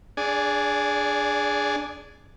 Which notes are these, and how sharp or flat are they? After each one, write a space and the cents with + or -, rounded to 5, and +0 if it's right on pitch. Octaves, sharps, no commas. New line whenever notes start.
D4 +0 G#4 +0 D5 -30